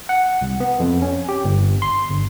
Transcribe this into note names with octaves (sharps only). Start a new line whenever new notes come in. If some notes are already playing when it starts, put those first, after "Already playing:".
F#5
C2
B3
F2
C#4
G4
G1
C6
G1